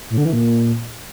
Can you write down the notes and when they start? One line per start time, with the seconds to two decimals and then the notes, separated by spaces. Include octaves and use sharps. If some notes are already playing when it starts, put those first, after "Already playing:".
0.10 A2
0.18 D3
0.25 E3
0.33 A#2